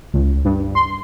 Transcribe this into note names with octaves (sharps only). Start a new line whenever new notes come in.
C#2
G2
C6